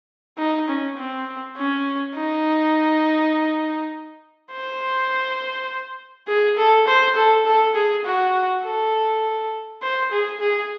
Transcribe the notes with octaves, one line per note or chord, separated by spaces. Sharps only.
D#4
C#4
C4
C#4
D#4
C5
G#4
A4
C5
A4
A4
G#4
F#4
A4
C5
G#4
G#4